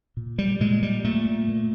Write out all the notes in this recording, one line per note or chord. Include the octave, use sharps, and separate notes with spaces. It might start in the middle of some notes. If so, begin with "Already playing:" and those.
A#2
G3
A#2 G#3
G3
A#2 A3
A#2